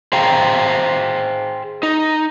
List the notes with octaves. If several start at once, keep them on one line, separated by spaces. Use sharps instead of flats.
G#4 C5 F5 G5 A#5
D#4